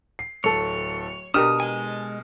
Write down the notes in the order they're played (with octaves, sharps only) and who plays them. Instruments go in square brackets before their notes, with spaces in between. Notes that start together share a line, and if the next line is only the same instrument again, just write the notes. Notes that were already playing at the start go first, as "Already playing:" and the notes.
[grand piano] C7
[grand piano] D1 A4 [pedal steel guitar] C#5
[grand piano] B2 F6 E7 [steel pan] D4 G4 A#4 [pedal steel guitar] D#6
[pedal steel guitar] G#3 G#5